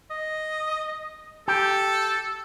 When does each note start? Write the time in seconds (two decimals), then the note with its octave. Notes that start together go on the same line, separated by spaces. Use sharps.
0.10 D#5
1.48 G4 A4